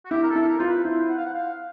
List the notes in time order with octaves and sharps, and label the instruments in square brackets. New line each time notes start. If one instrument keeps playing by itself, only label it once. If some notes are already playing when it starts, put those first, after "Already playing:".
[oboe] F#4
[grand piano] E4 [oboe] G4
[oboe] A#4
A4
[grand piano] E4
[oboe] A4
A#4
[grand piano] F4 [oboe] C5
[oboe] B4
[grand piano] E4 [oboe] C5
[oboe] F#5
F5
F#5
F5